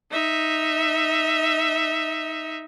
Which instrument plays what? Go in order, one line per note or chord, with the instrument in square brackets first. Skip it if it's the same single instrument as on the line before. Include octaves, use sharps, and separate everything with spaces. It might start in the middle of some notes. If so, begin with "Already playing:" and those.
[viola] D#4 E5